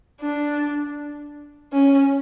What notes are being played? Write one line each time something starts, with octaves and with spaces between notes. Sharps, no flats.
D4
C#4